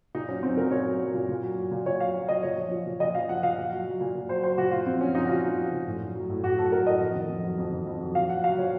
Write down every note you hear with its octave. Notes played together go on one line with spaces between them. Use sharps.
A#2 D#4
F#3 C#4
F#3 C4
A#2 A#4
A#2 C#5
F#3
F#3
A#2
A#2
F#3
F#3
A#2
A#2 C#5
F#3 F5
F#3
A#2 D#5
A#2 C#5
F3
F3
A#2
A#2 D#5
F3 F5
F3 F#5
A#2 F5
A#2
F#3
F#3
A#2
A#2
F#3 C5
F#3 C5
A#2 F#4
A#2 F4
F3 C4
F3 C#4
A#2 D#4
F#4
A#2 F4
F3
F3
A#2
A2
F#3
F#3
A2
A2 F#4
F#3 A4
F#3 A#4
A2 D#5
F2
D#3
F2
F#3
F2
D#3
F2
F#3
A#2 F5
F#3 F#5
F#3 F5
A#2 C#5